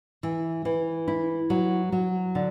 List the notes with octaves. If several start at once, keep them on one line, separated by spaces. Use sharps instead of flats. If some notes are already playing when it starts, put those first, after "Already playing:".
E3
E3
E4
F#3
F#3
D3